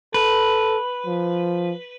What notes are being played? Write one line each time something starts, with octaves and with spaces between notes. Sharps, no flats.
A4 B4
F3